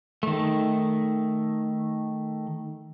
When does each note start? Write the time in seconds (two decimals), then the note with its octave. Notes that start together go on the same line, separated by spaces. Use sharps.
0.23 D#3 A3